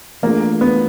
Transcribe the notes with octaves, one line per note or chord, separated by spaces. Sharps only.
E3 A3 A#3 D4 F4 G#4
B3